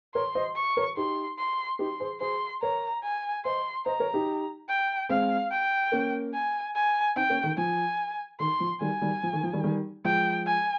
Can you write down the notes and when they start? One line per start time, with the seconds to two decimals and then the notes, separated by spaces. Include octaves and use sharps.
0.15 A#4 C#5 C6
0.35 C5 D#5
0.56 C#6
0.77 A#4 C#5
0.97 D#4 G4 C6
1.38 C6
1.79 D#4 G4 C6
2.00 G#4 C5
2.21 G#4 C5 C6
2.62 A#4 C#5 A#5
3.03 G#5
3.45 C5 D#5 C6
3.86 C5 D#5 A#5
3.99 A#4 C#5
4.14 D#4 G4
4.68 G5
5.09 G#3 C4 F5
5.51 G5
5.92 A#3 C#4
6.34 G#5
6.75 G#5
7.16 C4 D#4 G5
7.30 A#3 C#4
7.43 D#3
7.57 F3 G#5
8.40 D#3 C6
8.60 F3
8.81 D#3 G3 G#5
9.02 D#3 G3
9.23 F3
9.33 D#3
9.43 F3
9.53 D#3 G3
9.64 D#3 G3
10.05 F3 G#3 G5
10.46 G#5